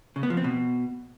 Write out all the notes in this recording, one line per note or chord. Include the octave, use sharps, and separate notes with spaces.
C#3
B3
F3
C4
B2